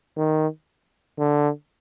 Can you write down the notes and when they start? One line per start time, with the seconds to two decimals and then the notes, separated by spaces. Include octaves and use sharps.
0.16 D#3
1.18 D3